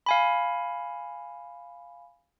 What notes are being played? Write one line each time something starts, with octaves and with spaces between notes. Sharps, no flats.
F5 G#5 B5